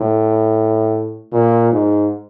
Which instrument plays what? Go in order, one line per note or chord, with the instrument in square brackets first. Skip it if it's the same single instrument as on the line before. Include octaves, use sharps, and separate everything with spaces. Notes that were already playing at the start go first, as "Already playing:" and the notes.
Already playing: [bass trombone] A2
A#2
G#2